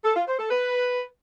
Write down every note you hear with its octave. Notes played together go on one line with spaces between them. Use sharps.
A4
F4
C5
A4
B4